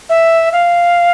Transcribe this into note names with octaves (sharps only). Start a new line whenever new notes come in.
E5
F5